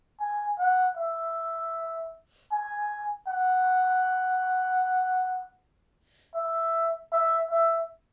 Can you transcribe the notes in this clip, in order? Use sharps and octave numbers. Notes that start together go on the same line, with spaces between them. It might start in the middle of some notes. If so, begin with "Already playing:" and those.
G#5
F#5
E5
G#5
F#5
E5
E5
E5